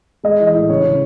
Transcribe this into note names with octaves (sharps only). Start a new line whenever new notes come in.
G#3 D#5
E3
D#5
A2
C#3 C#5
C#3